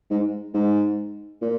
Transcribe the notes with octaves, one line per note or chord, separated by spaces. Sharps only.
G#2
G#2
A#2